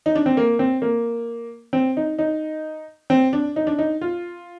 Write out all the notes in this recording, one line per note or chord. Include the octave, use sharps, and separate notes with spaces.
D#4
D4
C4
A#3
C4
A#3
C4
D#4
D#4
C4
D4
D#4
D4
D#4
F4